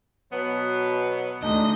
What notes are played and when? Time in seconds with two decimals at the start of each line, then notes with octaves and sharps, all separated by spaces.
0.32 B2 F#3 B3
1.43 D2 G#3 D4 D#4 D#5